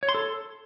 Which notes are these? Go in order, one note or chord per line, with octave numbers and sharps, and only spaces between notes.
C#5
C6
A4